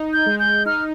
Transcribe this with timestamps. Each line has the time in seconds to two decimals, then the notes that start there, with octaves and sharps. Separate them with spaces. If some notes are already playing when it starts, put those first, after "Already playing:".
Already playing: D#4
0.13 G6
0.26 G#3
0.39 G6
0.66 D#4 F6